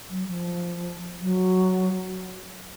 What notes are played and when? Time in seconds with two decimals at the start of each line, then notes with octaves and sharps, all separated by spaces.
0.10 F#3
0.28 F3
1.21 F#3